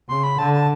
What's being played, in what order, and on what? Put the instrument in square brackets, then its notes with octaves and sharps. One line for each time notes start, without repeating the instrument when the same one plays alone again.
[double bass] C#3 [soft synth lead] C6
[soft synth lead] B5
[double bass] D3 [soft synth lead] A5
[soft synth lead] A5